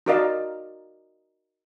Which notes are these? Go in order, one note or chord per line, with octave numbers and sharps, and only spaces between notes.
D#4 F#4 A#4 D5 D#5 F5